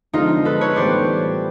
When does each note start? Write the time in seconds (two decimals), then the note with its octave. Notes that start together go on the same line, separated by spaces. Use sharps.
0.13 D3 F3 G#3 B3 D4 D#4 F4
0.45 A4 B4
0.61 B4 C#5
0.76 A2 E3 G3 B3 C5 D5